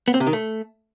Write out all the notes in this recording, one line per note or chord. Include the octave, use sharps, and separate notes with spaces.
B3
C4
C3
D#3
A3